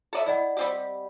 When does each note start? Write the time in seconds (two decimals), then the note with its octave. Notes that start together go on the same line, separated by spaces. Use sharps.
0.13 A4 D5 E5
0.26 E4 D5 D#5 F#5
0.57 G3 C4 G4